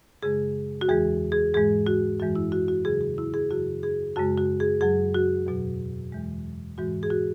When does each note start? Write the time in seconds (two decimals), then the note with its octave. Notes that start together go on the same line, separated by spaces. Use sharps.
0.23 F#2 C#3 G#3 G#4
0.81 F#4
0.89 E2 E3 G#3 G#4
1.32 G#4
1.54 G#2 E3 G#3 G#4
1.87 F#4
2.20 F#2 E3 G#3 F#4
2.36 E4
2.52 F#4
2.68 F#4
2.85 E2 C#3 F#3 G#4
3.01 G#4
3.18 E4
3.34 G#4
3.50 F#2 C#3 F#3 F#4
3.83 G#4
4.16 F#2 C#3 G#3 F#4
4.38 F#4
4.60 G#4
4.81 F#2 F#3 G#4
5.14 F#4
5.47 E2 B2 F#3
6.12 E2 E3 G#3
6.78 G#2 E3 G#3 F#4
7.03 G#4
7.10 F#4